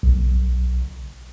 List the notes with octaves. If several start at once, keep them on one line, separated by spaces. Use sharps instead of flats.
B1